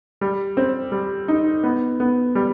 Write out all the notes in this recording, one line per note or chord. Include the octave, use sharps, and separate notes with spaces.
G3
C4
G3
D#4
B3
B3
G3